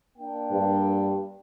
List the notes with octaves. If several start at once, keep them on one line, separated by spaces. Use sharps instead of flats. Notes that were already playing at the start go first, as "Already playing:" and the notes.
A#3 D4 G5
G2